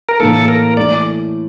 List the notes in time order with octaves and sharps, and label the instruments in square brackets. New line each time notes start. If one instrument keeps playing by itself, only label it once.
[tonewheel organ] A#4
[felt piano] A2 E3 A#3 [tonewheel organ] A4
[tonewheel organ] A#4
[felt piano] E3 A3 E4 [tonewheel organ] D5